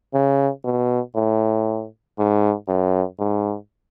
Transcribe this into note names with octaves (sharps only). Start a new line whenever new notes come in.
C#3
B2
A2
G#2
F#2
G#2